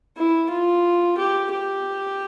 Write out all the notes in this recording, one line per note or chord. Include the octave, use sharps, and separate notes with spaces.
E4
F4
G4
G4